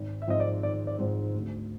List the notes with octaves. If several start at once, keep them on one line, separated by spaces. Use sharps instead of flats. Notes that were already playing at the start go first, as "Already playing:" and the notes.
Already playing: G#1
E5
G#2 F3 G#3 C4 D#5
D5
G#1 D5
D5
G#2 F3 G#3 C4
D2